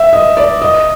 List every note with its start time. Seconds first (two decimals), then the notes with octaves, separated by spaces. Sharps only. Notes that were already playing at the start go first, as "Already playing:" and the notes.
Already playing: E5
0.13 D#5
0.37 D5
0.62 D#5